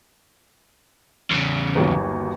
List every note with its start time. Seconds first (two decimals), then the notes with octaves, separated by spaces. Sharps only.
1.31 E2 C#3
1.75 G1 D#2 F#3